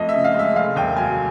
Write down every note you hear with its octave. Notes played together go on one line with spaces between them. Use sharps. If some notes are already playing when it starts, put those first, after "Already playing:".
Already playing: F2 A3 D#5
E5
C#3
F5
G#3 E5
F1 F5
D#2 G5
F#3 G#5